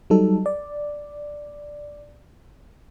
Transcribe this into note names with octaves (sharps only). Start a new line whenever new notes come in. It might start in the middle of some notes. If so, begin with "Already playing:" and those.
F#3 G3 D#4 A4
D5